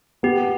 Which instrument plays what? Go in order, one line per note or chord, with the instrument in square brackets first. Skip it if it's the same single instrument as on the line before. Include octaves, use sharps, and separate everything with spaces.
[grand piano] B3 [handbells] G4